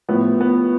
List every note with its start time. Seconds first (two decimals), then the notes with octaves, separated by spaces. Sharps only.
0.09 A2 F3 B3
0.41 B3